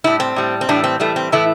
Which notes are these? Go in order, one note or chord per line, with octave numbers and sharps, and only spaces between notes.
A2 G3 E4
C4
A2 G3
C4
A2 E3 G3 D4
C4
A2 E3 G3 A3
C4
A2 E3 A3 E4